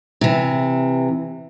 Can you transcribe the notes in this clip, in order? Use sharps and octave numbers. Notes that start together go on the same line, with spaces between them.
C3 E3